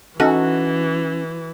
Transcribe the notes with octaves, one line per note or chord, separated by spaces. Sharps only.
E3 C#4 D#4 F#4 A4